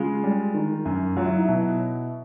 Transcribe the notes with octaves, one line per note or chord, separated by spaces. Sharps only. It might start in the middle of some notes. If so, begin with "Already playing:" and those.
Already playing: C#3 G#3 F4
G3
D#3
F#2
F#3 F4
E4
D#4
B2 E4